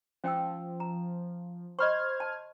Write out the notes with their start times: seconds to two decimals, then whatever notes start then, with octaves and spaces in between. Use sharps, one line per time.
0.24 F3 C#4 G5 E6
0.80 A#5
1.79 C5 D#5 B5 C#6 F6 G#6
2.20 A5